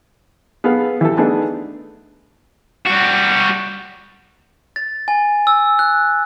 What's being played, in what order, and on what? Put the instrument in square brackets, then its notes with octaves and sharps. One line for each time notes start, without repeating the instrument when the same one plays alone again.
[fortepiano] B3 G#4 A4 F5
E3 G4 A4
A3 B3 D4 D#4 G#4 D#5
[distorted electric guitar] G3 F#4
[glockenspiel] A6
G#5
E6
F#6